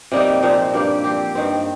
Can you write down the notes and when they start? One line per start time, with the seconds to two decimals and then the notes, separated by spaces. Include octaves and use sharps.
0.12 C3 G3 A#3 D#4
0.43 A#2 F3 C4 D#4
0.73 G2 G3 A#3 G4
1.04 F3 C4 G4
1.35 G2 D#3 C4